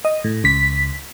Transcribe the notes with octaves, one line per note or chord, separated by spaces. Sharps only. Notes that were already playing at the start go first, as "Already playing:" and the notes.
D#5
A2
C#2 B6